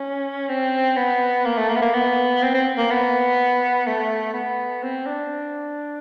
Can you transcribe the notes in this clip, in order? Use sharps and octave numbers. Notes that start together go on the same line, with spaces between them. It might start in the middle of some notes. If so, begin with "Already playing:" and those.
Already playing: C#4
C4
B3
A#3
A3
A#3
B3
A#3
B3
C4
C4
A#3
B3
A3
B3
C4
D4